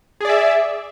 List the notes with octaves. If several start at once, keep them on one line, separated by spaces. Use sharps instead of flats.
G#4 D5 E5